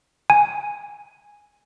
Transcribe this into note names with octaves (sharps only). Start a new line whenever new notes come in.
G#5